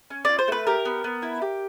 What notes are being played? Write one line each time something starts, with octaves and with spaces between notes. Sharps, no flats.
C#4
F4 D5
C5
A3 B4
G4 A#4
B3
B3
E4
G4